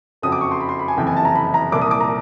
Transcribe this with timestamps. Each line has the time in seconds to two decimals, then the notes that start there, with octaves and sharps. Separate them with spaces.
0.22 F#1 F2 C#3 F#3 D#6
0.32 D6
0.41 C#6
0.51 C6
0.60 B5
0.69 C6
0.79 B5
0.88 G#5
0.97 F#1 F2 C3 E3 G5
1.07 G#5
1.17 A5
1.25 A#5
1.35 B5
1.54 A#5
1.72 C2 A#2 F3 A#3 D6
1.81 D#6
1.91 D6
2.00 A#5